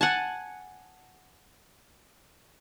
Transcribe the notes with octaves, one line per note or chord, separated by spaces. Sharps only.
F#5 G#5 A5